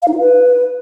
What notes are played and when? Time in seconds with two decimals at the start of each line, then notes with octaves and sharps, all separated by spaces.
0.02 F5
0.08 D#4
0.13 F4
0.19 B4